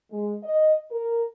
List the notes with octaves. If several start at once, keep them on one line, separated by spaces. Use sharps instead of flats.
G#3
D#5
A#4